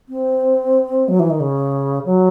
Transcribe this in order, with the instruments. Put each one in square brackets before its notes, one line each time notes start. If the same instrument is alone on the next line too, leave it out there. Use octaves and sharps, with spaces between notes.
[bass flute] C4
F#3
E3
D#3
C#3
F#3